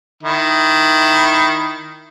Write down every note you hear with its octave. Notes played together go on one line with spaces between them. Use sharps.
D#3 E4